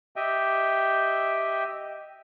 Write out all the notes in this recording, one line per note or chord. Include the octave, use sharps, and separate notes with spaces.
G4 D#5 E5 G5